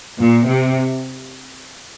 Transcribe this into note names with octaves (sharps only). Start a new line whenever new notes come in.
A#2
C3